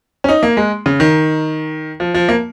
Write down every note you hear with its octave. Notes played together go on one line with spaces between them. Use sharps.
C#4
D#4
A#3
G#3
C#3
D#3
F3
F3
A#3